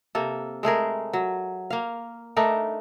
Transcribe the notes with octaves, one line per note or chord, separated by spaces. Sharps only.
C3 A#3 A4
G#3 A3 G#4 A#4
F#3
A#3 F5
A3 D4 D#4 A#4